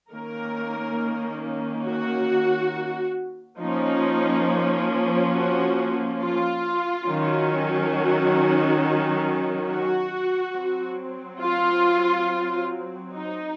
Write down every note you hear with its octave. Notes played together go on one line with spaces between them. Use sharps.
D#3 A#3 C#4 A#4
F#4
F3 A#3 C#4 D#4
F#4
F4
D#3 F#3 C#4
F#4
F#4
F#3 C4
F4
D#4